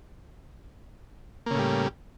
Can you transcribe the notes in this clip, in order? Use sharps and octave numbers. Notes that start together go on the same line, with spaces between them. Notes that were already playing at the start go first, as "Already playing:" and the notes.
A2 C#3 G3 A#3